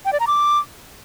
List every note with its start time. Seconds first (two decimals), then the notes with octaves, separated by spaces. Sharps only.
0.05 G5
0.13 D5
0.20 A#5
0.27 D6